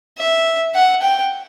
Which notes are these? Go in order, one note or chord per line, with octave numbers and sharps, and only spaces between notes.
E5
F#5
G5